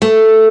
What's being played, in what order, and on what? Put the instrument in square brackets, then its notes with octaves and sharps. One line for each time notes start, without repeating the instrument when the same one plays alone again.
[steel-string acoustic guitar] A3